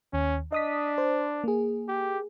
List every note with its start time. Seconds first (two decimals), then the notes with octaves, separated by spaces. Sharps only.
0.13 D#2 C#4
0.52 D4 D#5 D#6 B6
0.98 C5
1.44 A#3 G#4
1.88 G4